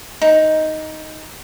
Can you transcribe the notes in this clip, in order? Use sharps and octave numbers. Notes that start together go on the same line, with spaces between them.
D#4